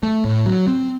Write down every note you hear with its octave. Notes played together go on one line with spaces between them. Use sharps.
A3
A2
F#3
C4